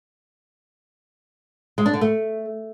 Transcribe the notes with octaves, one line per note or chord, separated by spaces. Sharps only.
G#3
D4
D3
A3